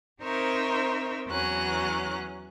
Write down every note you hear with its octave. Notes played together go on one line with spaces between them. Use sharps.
C4 D#4 A#4 C5 C#5 E5
E2 E3 F#3 C#4 A#5 F#6